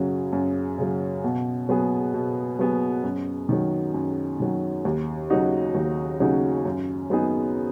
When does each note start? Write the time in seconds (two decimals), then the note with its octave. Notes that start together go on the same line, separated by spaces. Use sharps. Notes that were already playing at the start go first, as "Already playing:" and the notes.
Already playing: F#2 C#3 F#3
0.32 F#2
0.78 C#3 F#3
1.24 B2
1.69 F#3 B3 G#4
2.14 B2
2.59 F#3 B3 G#4
3.03 F#2
3.49 D#3 F#3
3.94 F#2
4.40 D#3 F#3
4.85 D#2
5.30 C#3 F#3 D#4 F#4
5.75 D#2
6.20 C#3 F#3 D#4 F#4
6.65 F#2
7.10 F#3 B3 D#4 G#4